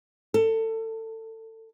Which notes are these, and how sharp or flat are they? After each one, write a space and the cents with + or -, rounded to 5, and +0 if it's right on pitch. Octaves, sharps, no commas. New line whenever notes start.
A4 +25